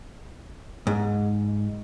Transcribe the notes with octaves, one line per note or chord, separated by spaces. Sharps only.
G#2